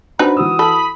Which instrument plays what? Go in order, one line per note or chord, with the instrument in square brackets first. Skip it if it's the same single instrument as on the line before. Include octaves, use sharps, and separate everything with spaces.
[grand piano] D4 F#4 C5 [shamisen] D#4 B4 [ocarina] B5
[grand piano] E3 F#4 E6 [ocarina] D#6
[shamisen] A4 [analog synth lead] B5